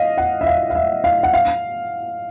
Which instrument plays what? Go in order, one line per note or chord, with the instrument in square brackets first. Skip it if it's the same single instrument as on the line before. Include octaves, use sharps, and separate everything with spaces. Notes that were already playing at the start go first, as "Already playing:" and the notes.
Already playing: [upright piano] D#5 F5
F#5
E5
F5
F5
E5
F5
F#5
F5